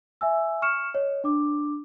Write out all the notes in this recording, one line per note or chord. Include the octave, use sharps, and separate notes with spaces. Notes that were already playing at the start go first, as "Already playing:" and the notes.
E5 G#5 E6
C#6 F6 C#7 E7
C#5 D#5
D4 D6